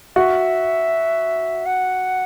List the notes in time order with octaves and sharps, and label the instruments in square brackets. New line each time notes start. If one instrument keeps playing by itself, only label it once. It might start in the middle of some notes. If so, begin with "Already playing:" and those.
[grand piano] F#4 [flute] E5
[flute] F#5